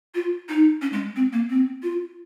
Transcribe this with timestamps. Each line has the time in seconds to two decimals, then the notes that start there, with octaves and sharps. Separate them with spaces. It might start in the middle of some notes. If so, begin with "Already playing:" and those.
0.15 F4
0.49 D#4
0.82 C#4
0.93 G#3
1.16 C4
1.33 A#3
1.50 C4
1.83 F4